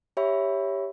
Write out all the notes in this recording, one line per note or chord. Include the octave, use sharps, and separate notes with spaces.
G4 C#5 E5 B5